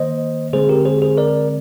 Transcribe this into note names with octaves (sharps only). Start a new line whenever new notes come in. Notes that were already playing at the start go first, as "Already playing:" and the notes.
Already playing: D#3 A#3 C5 D#5
D3 G#3 C4 G#4 C5
G4 A#4
G#4 C5
G#4 C5
A#4 D5